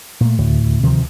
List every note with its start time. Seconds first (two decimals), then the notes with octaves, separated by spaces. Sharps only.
0.21 A#2 A3
0.39 D2 A2
0.83 C3 D#3 F3